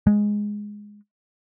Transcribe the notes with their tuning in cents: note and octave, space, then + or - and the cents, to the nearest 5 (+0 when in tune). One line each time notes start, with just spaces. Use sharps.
G#3 +0